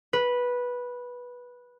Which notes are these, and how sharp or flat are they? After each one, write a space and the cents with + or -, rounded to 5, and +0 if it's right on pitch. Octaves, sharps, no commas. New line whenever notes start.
B4 -10